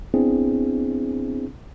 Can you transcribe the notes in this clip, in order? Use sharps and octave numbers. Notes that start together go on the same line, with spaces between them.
B3 C4 D4 E4 G#4